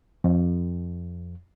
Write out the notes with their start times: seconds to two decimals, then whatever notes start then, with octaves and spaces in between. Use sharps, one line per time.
0.24 F2